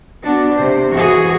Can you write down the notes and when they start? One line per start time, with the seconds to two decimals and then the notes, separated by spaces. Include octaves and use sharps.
0.25 B3 D4 F#4
0.55 C3 C5
0.93 E3 F#4 G#4